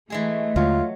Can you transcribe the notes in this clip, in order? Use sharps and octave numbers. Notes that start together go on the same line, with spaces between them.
E3 G#3 A3 G#4
D#2 D3 F#3 G#3 F4